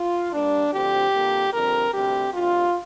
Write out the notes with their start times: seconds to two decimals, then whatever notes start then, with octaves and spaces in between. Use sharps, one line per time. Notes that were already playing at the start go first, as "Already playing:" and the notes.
Already playing: F4
0.33 G2 G3 A#3 D4
0.73 D2 D3 F3 C4 G4
1.14 F2 D3 G3 A#3
1.53 F2 D3 G3 C4 A#4
1.94 D2 C3 G3 C4 G4
2.34 D2 C3 G3 F4